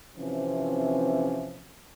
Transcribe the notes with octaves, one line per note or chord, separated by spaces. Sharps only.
C3 E3 F3 C4 C#4